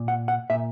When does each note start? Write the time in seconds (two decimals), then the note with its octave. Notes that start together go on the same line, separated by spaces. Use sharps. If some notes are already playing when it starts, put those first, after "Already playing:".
Already playing: A#2
0.08 F#5
0.28 F#5
0.50 A#2 E5